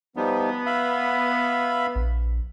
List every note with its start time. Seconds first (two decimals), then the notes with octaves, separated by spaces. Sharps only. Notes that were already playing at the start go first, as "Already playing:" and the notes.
0.16 F3 G3 B3 D#4
0.66 E5 F5 B5
1.95 A#1